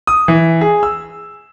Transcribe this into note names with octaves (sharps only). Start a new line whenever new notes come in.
D#6
E3
G#4
E6